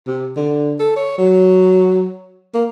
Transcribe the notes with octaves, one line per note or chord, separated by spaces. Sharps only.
C3
D3
A4
C#5
F#3
A#3